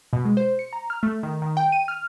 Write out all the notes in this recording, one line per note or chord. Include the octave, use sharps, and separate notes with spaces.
B2
G#3
C5
C#7
A#5
F6
A3
D#3
D#3
G5
D#7
F6